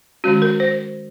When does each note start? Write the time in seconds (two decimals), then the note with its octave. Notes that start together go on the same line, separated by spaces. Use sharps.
0.24 D#3 G#3 C#4 F#4
0.42 A#4
0.60 C5